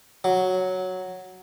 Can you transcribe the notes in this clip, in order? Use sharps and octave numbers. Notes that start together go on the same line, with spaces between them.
F#3